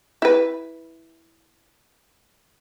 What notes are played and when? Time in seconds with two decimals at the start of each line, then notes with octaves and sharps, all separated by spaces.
0.22 E4 B4